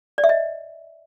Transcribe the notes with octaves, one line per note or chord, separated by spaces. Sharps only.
D5
E5
D#5